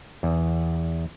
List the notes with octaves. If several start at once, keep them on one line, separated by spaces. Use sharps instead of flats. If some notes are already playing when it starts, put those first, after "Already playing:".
E2